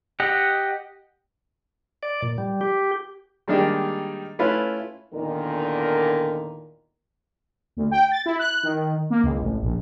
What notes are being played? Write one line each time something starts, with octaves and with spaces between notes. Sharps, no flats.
G4 D#5 F#5
D5
A#2
G3
G4
D#3 G3 G#3 A#3 D4 D#4
A3 C#4 E4 F4 B4
E2 A#2 D3 D#3
D2
G5
A6
E4
F#6
D#3
A#3
C#2
A1
A#1